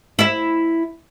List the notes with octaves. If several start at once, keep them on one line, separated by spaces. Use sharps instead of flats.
E4 E5